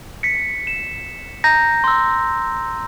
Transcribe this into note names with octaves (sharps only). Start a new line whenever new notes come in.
B6 C#7
E7
A#5 G6 A#6
C6 E6